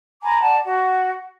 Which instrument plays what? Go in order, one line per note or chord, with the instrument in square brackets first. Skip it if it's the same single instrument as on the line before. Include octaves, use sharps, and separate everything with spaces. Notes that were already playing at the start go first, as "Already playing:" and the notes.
[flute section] G#5 A#5 B5 D6
D5 F#5 A5
F#4 F#5